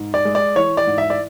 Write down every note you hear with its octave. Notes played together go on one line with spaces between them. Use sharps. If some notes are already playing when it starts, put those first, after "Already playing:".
Already playing: G#2
D5
G#3
D5
E3 C#5
D5
G#2
E5
D5